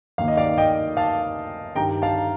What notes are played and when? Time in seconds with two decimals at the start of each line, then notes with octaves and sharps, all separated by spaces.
0.18 D#2 D#3 A#3 F5
0.28 D#5
0.37 D5 F5
0.58 D#5 G5
0.97 F5 A5
1.76 G2 D#3 G3 G5 A#5
2.02 F5 A5